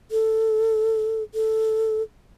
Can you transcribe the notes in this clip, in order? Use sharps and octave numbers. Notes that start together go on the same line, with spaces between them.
A4
A4